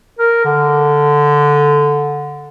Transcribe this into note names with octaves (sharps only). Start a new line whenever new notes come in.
A#4
D3